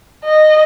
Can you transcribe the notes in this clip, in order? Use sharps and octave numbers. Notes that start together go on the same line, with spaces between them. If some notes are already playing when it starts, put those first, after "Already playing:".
D#5